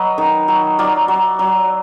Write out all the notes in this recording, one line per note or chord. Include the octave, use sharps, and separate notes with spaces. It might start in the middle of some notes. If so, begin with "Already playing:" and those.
Already playing: F#3 B4 D#5
D#3
F#3
F#3 D5 F5
F#3
F#3